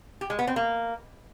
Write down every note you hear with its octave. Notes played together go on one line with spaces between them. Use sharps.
G4
G#3
B3
C4
A#3